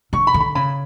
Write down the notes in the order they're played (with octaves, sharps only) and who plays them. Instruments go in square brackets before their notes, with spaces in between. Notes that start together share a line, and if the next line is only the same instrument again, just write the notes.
[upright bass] D3 [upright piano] C#6
[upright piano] B5
[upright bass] D3
[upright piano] B5
[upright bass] C#3 [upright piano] B5